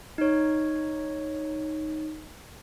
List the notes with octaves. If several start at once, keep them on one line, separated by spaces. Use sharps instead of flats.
D#4 C#5